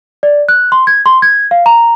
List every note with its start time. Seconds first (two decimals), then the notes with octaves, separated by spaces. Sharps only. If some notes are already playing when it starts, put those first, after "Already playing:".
0.23 D5
0.49 F#6
0.72 C6
0.87 G#6
1.06 C6
1.22 G#6
1.51 F5
1.66 A#5